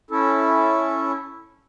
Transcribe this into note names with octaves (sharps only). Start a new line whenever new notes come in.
C#4 E4 A4